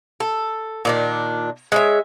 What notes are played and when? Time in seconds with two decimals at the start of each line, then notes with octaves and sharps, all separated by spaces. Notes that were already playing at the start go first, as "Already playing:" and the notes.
0.20 A4
0.85 A#2 D#3 D4
1.72 G#3 C#4 E5